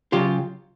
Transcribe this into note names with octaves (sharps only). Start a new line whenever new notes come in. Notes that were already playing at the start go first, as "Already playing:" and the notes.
C#3 F#3 F4 G4